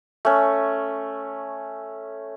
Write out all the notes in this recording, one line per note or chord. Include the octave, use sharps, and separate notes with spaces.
A3 C#4